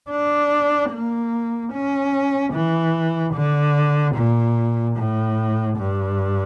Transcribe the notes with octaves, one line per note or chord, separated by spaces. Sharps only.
D4
A#3
C#4
E3
D3
A#2
A2
G2